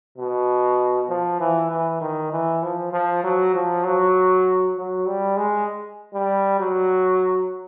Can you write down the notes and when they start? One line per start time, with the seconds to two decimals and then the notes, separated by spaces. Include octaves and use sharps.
0.18 B2
1.09 F3
1.40 E3
1.71 E3
2.01 D#3
2.32 E3
2.63 F3
2.92 F3
3.23 F#3
3.55 F3
3.84 F#3
4.76 F#3
5.06 G3
5.37 G#3
6.14 G3
6.60 F#3